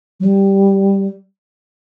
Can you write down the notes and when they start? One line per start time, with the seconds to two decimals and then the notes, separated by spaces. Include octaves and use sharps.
0.20 F#3
0.25 G3